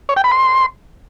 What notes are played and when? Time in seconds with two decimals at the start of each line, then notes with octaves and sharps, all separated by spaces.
0.09 C#5
0.17 G5
0.24 B5
0.32 C6